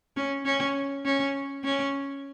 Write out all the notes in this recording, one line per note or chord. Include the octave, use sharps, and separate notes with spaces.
C#4
C#4
C#4
C#4